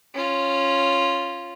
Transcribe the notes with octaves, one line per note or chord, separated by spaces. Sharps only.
C#4 F4